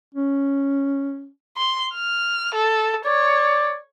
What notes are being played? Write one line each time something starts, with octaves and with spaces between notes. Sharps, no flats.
C#4
C6
F6
A4
C#5 D5